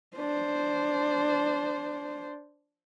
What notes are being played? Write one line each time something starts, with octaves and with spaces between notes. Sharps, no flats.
D4 C5